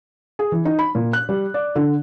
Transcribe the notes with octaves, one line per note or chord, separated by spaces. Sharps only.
G#4
E3
D#4
B5
A#2
F#6
G3
D5
D3